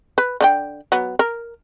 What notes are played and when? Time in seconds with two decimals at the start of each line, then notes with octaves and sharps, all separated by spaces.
0.18 B4
0.41 D3 D#4 G5
0.92 F#3 B3
1.19 A#4